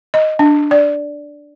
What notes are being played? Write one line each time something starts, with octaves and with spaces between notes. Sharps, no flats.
D#5
D4
D5